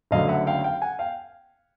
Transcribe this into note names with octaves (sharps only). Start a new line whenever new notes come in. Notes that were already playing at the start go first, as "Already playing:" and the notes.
F#1 F#2 D3 F#3 A3 D#5 F5
E5 F#5
F5 G5
F5 G5
F#5 G#5
F5 G5